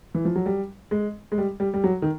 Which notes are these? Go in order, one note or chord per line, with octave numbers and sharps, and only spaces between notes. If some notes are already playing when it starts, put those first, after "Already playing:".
E3
F3
F#3
G3
G#3
G#3
G3
G3
G3
F#3
D#3